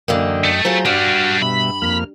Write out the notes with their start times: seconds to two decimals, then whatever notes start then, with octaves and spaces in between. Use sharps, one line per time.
0.08 F#2 D3 E3 A#3 D#5 G5
0.44 A3
0.65 F#3 F4 G#4 C5 A#5
0.85 G2 G3 D4 F#4 F#5 F6
1.42 B2 G3 E5 B5
1.82 F2 A#3 F6